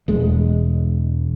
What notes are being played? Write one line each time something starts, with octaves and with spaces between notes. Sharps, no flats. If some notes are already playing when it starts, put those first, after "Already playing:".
E1 G#3